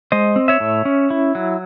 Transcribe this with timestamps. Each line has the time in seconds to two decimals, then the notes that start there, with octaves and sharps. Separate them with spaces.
0.12 G#3 C5 D#5
0.36 C4
0.48 C#5 E5
0.60 A2
0.85 C#4
1.10 E4
1.35 F#3